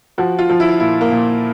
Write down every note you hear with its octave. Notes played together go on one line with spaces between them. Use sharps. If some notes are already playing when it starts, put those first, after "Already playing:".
F3 F#4
F4
F3
E4
A#2 E4
A#3
A#2